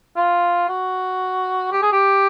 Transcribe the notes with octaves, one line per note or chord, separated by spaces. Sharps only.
F4
F#4
G4
G#4
G4